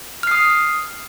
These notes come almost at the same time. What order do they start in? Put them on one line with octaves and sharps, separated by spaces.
F6 C7 D#6